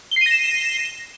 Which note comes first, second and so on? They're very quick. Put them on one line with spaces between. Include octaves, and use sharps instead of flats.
G7 C7 D#7 A#6 E7